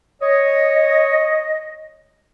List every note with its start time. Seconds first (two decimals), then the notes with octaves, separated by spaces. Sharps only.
0.21 C#5 D#5